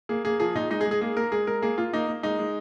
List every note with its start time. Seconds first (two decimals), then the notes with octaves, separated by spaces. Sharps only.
0.09 A#3 G#4
0.25 A#3 G#4
0.40 F3 G#4
0.55 A#2 D#4
0.70 G#3 D#4
0.81 G#4
0.86 G#3
0.91 G#4
1.01 A#3 G#4
1.17 A#3 A#4
1.32 G#3 G#4
1.47 G#3 A#4
1.62 A#3 G#4
1.78 A#3 F4
1.93 A#3 D#4
2.08 A#3
2.23 G#3 D#4
2.39 G#3